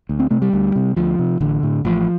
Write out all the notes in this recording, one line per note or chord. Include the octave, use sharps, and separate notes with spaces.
D2
C4
C3 A3
G3
D2
C3
D2 F3
C3
A1 D3
A2
A1 F3